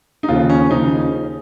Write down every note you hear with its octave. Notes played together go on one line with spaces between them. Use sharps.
D#4
D#2 C#3 F3 F4
C#4
D#2 C#3 F3 D#4